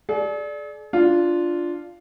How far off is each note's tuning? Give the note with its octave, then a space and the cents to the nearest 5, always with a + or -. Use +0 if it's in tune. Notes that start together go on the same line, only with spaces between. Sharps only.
G#4 +45 D5 +0
D4 +0 F4 -5